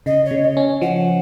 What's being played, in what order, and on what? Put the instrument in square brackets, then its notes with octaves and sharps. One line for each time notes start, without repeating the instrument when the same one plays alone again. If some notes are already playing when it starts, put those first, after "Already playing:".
[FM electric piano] C#3 [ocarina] D#5
[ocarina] C#5
[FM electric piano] C#3
[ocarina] D#5
[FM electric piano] C#4
[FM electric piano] F3 [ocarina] F#5